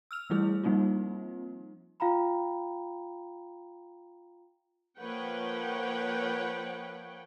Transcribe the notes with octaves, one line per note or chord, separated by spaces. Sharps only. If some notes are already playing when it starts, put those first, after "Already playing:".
E6 F6 F7
E3 G3 A3 E4 G#4
F3 G3 A#3 C4 D#4 F4
F4 F5 G5 A#5 B5
F3 A#3 B4 C#5 F#5 G5